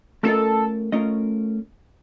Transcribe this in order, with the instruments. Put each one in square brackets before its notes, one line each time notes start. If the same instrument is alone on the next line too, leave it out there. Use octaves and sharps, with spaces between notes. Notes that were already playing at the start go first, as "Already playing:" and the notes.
[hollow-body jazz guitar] A3 C#4 F4 A#4 D#5 [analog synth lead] A4
[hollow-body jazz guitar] A3 C#4 F4 A#4 D#5